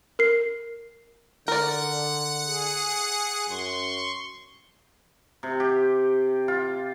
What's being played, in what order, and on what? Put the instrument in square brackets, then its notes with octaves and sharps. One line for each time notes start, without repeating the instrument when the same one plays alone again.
[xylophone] A#4 C7
[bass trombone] D3 [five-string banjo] A#4 D5 [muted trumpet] F#5
[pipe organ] G#4
[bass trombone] F#2 [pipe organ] C6 C#6
[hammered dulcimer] C3
G4
F4